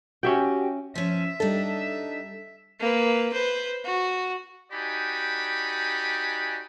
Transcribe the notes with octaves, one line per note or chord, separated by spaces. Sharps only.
C#4 F#4 G4 E5 G5
F3 C#4 E5
G3 D4 D#4 A4
A#3 B4
B4 C5
F#4
D#4 F#4 G4 D5 G#5 B5